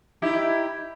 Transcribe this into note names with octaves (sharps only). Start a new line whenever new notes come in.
D#4 E4 G4